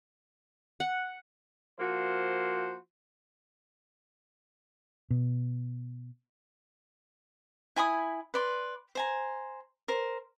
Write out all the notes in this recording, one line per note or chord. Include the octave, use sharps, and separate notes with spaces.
F#5
F3 A#3 F#4 C5
B2
E4 G#5 B5 D#6
B4 D5 C6
C5 G#5 A#5
A#4 C5